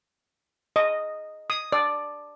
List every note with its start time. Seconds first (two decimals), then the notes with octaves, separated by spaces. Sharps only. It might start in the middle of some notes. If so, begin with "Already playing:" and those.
0.76 D#5
1.50 D#6
1.72 D5